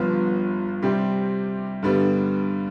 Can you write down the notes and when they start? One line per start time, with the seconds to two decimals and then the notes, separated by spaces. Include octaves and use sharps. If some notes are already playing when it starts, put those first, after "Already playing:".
Already playing: G1 G2 F3 B3 F4
0.82 C3 G3 C4 G4
1.83 G2 D3 G3 B3